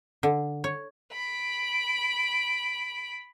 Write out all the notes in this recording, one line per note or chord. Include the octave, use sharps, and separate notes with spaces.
D3
C#5
B5 D7